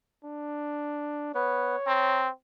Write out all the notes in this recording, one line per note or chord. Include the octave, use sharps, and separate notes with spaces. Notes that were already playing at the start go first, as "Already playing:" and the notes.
D4
B3 B4 C#5
C4 A#5